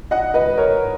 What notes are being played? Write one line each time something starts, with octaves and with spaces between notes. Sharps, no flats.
D#5 F#5
B4 D#5
A#4 C#5